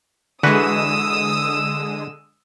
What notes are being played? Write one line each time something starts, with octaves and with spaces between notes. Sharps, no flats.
D3 E3 G#3 F#4 B4 D#6 E6